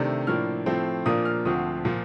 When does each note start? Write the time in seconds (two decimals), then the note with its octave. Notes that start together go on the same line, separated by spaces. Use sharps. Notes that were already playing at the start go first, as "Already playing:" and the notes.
Already playing: C3 D#3 A3 D4
0.27 A2 F3 A#3 D4 F6
0.66 A2 F3 A3 C4
1.06 A#2 F3 A#3 D4 D#6
1.25 F6
1.45 D2 D3 F3 C4 D#6
1.85 A#2 F3